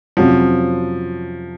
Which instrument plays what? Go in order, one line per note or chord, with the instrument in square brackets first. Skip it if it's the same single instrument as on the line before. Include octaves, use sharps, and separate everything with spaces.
[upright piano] F2 C3 F#3 C#4 F#4 [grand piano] F3